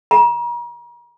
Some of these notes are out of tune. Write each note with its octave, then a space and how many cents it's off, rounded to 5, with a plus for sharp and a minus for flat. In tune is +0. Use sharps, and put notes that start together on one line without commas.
A#5 +40